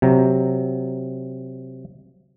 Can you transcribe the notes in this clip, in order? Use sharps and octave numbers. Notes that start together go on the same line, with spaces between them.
C3 F#3 A#5